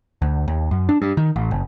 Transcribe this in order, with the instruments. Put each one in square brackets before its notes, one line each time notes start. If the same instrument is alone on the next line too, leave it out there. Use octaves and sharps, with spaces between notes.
[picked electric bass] D2
D#2
F#2
D4
G2
D#3
A1
F#1